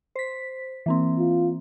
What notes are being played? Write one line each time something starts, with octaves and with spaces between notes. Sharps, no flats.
C5 B6
E3 A#3 C4
F4